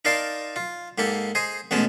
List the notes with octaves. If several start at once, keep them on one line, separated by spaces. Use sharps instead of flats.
D#4 A#4 D5 F5 A5 C6
F4
G#2 A#3 G4 A4
G#4 C5 D#5
A1 B2 G#3 C#4 A5